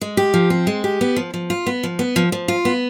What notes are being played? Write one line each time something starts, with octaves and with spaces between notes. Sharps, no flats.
G#3
G4
F3
C4
G#3
G4
B3
F3
F3
F4
B3
F3
B3
F3
F3
F4
B3